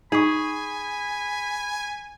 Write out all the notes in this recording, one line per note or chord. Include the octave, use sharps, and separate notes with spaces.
D#4 G#4 G#5 B5 C#6